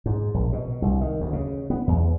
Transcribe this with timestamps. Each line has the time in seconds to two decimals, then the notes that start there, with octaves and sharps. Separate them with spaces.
0.06 G#2
0.34 A#1
0.53 B2
0.82 C2
1.01 D#3
1.20 D2
1.33 C#3
1.70 B3
1.87 E2